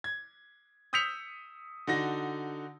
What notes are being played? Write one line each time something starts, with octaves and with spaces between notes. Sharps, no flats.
G#6
D#6 E6 G6 B6 C#7 F7
D3 D#4 F#4 A#6